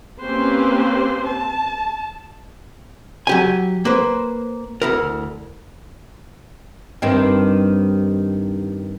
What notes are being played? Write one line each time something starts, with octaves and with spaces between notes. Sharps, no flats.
A#3 C4 C#4 G4 B4 C5
A5
F#3 G4 G#5
A#3 B4 C5
D2 E4 A#4
G2 D#3 C4